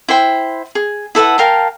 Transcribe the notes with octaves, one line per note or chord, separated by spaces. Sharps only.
E4 C5 G5
G#4
E4 A4 B4 F#5
A#4 F5 G5 A5